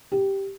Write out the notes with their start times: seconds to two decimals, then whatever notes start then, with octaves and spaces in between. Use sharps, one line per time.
0.12 G4